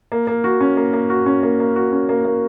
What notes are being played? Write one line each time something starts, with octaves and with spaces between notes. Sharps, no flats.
A#3
A#3
F#4
C#4
A#3
A#3
F#4
C#4
A#3
A#3
F#4
C#4
A#3
A#3